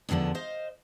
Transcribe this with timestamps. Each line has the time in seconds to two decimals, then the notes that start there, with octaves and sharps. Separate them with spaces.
0.09 E2 A2 D3 F3 D4
0.35 C5 D#5 F5